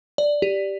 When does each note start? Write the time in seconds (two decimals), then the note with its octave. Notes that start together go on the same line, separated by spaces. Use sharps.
0.18 D5
0.42 G4